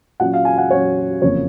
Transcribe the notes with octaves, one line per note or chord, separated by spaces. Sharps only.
A#2 F#3 C#4 F#5
F5
G#5
F#5
A#2 F#3 C#4 C#5
F#1 F2 C#3 F3 A#3 C#5